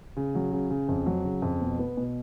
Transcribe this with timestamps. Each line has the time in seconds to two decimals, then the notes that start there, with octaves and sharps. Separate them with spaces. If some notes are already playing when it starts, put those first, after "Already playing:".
0.17 C#3
0.35 F#3
0.52 C#3
0.70 C#3
0.89 F2
1.06 F#3
1.25 C#3
1.42 F2
1.62 B2
1.79 B3
1.97 B2